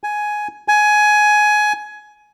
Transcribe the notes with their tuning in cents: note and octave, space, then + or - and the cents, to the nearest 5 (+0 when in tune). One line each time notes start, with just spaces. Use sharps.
G#5 +10
G#5 +15